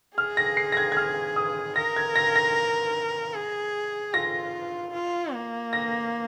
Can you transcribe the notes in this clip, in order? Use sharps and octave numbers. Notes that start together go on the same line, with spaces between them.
G#4 F6
A#6
C7
A#6
G#6
G#6
F6
D#6
A#4 A#6
G#6
A#6
A#6
G#4
F4 A#6
F4
A#3
A#6